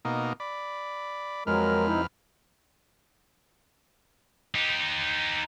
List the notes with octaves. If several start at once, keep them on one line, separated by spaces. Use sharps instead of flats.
B2 A#3 D#4
D5 B5
F2 F#3 G#3 A#4 B4 F6
C3 D#4 E4
D#4 G4